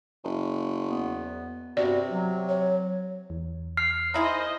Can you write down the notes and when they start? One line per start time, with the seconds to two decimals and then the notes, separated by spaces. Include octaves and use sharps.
0.24 F#1
0.88 E2 B3
1.77 G2 C3 B3 F#4 D5
2.10 F#3
2.49 C#5
3.30 E2
3.77 F6 C7
4.14 D#4 E4 G#4 C5 D#5